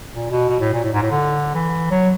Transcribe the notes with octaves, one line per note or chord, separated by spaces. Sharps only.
A#2
B2
B2
A2
A#2
A2
G#2
A2
D3
E3
F#3